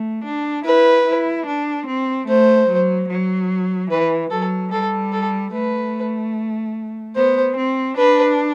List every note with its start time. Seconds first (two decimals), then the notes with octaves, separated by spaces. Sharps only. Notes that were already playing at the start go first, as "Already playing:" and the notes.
Already playing: A3
0.24 D4
0.65 E4 B4
1.06 E4
1.46 D4
1.87 C4
2.28 A3 C5
2.68 F#3
3.09 F#3
3.90 E3 B4
4.31 F#3 A4
4.72 G3 A4
5.12 A4
5.53 A3 B4
7.16 B3 C5
7.57 C4
7.97 D4 B4